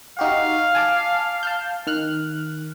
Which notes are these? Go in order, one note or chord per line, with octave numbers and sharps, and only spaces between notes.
D#4 F#4 G4 F5
G#5 A5 D6
A5 F6 G6
D#3 F6 F#6